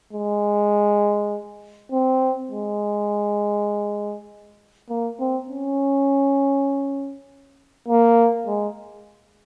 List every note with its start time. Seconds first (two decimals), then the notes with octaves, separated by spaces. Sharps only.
0.13 G#3
1.92 C4
2.51 G#3
4.90 A#3
5.20 C4
5.49 C#4
7.88 A#3
8.47 G#3